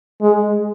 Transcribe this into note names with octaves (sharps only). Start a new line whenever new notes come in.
G#3